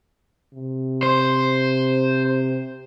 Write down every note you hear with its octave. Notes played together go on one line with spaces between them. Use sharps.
C3
C5